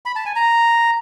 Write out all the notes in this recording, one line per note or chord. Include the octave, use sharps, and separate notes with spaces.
B5
A5
G#5
A#5